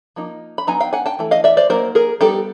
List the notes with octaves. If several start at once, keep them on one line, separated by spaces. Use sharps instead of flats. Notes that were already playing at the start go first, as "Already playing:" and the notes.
F3 A#3 D#4
B5
F#3 B3 D#4 G#5 A#5
F5 G5
F#5 G#5
G5 A5
E3 A3
D#5 F5
D5 E5
C5 D5
F#3 A#3 D#4 A#4 C5
G#4 A#4
G3 B3 D#4 G4 A4